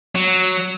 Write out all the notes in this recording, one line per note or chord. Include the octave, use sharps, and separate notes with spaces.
F#3